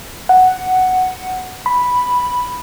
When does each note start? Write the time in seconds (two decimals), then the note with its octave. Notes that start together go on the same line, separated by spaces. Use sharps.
0.29 F#5
1.66 B5